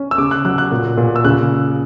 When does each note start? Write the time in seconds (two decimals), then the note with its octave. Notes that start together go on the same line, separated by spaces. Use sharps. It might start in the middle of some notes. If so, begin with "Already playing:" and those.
Already playing: C#4
0.11 E6
0.18 C#3 D6
0.31 F#6
0.45 F#3 F#6
0.58 F#6
0.71 A#2
0.98 A#2
1.16 E6
1.25 C#3 F#6